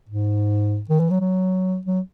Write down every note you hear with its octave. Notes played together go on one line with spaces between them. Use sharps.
G#2
D#3
E3
F#3
F#3
F#3